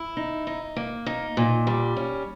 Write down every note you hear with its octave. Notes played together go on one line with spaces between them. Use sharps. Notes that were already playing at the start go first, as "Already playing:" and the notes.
Already playing: E4
D#4
D#4
A#3
D#4
A#2
G3
C#4